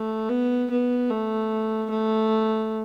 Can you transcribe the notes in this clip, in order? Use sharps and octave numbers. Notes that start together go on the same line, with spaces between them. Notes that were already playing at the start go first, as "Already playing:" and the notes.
Already playing: A3
B3
B3
A3
A3